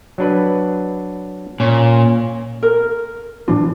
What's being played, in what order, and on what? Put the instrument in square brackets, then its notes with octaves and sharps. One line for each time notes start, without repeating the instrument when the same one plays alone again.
[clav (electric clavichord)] F#3 D4 B4
[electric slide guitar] A#2 [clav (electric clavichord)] C#4 C#5
[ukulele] A#4
[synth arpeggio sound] A2 E3 E4 [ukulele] D4